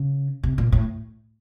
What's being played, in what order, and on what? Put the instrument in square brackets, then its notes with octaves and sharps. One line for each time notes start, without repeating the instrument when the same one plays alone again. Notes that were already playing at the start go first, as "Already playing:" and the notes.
Already playing: [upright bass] C#3
C3
A#2
A2